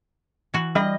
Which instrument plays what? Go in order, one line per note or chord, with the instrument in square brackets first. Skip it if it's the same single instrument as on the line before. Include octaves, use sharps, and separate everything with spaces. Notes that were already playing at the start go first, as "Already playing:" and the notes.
[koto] E3 F#4
[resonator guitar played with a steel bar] G3 D#5